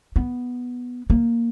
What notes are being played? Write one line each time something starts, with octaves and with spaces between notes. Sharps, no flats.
B3
A#3